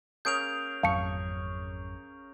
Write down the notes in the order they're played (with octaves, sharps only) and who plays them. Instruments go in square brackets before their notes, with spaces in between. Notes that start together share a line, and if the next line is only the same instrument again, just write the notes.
[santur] A#3 C#4 G#4 [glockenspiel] G6 D7 F7
[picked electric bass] G#1 F2 F#3 [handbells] F5 A5 C#7 [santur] C#6